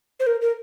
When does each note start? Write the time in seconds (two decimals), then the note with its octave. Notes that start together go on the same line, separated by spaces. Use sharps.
0.20 C5
0.27 A#4
0.41 A#4